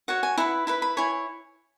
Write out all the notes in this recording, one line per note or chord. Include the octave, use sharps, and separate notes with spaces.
F#4 C#5 F#5
G#5
E4 B4 F#5
E4 B4 B5
B5
E4 C#5 G#5